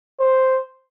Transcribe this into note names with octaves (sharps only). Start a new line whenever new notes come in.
C5